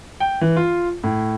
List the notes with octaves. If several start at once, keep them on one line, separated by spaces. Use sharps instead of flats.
G5
E3
F4
A2